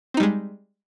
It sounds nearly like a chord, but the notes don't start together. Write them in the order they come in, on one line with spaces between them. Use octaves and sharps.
C4 D#4 G3 G#3